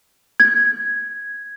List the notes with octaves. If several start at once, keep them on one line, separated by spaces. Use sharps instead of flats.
G#6